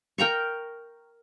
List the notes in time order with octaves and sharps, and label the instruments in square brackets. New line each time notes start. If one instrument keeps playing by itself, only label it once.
[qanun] A#4 G5 A#5 C#6